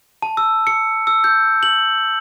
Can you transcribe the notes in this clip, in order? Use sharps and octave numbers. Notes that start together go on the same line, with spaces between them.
A5
E6
C#7
E6
G6
F#7